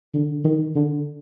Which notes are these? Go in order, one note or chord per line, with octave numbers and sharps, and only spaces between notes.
D3
D#3
D3